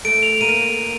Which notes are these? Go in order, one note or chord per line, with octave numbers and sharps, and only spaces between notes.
A3 A4 D7
F7
A#3 A#4 D#7